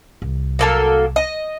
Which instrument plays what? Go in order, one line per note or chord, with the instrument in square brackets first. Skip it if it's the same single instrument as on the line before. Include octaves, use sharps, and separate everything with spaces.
[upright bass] C2
[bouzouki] F#3 A#3 A4
D#5